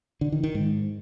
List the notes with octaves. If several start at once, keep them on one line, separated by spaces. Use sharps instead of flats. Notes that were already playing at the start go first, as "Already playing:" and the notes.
D3
D#3
D#3
G#2